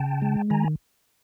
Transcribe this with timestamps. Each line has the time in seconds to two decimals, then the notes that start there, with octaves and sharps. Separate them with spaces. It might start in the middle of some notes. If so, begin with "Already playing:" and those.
Already playing: C#3 G5 A5
0.22 G#3
0.50 D#3 G#5 A#5